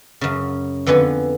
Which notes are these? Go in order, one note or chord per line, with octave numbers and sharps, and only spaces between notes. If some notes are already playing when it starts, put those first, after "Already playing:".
F#2 C#3
F2 D3 B3 B4 G#5